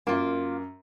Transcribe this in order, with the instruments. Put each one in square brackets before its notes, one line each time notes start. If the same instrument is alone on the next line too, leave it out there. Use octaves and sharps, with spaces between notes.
[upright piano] F#2 [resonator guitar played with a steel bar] A#3 F4